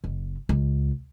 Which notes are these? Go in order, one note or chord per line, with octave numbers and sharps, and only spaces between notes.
F#1
C#2